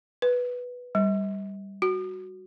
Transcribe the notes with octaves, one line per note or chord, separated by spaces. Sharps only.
B4
G3
F#4